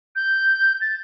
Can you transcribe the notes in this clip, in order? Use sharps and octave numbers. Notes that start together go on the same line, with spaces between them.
G6
A6